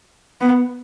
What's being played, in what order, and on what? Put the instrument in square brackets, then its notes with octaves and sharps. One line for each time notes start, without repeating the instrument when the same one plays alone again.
[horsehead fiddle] B3